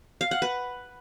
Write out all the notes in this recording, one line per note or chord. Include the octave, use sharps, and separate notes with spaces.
F5
F#5
B4